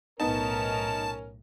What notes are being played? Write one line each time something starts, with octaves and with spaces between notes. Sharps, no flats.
B1 A2 B3 C#4 D#4 A#4 A5